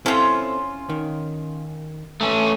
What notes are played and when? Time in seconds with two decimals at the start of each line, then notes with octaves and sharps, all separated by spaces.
0.06 C4 C#4 E4 F4 A4
0.89 D#3
2.21 A3 C#4